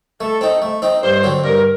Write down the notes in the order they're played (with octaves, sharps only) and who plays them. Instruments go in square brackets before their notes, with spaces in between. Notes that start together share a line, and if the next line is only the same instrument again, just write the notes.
[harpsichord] A3 [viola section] A4
[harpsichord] C4 D#4
A3
C4 D#4
[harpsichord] G2 [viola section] C5
[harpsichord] D3 F#3 C4
[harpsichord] G2 [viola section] A#4